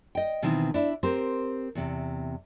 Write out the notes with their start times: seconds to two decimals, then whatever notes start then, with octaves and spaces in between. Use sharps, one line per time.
0.15 D#5 G5
0.42 B2 D#3 E3 C4 E4
0.74 D4 E4
1.03 C4 G4 A#4 C5
1.75 E2 C3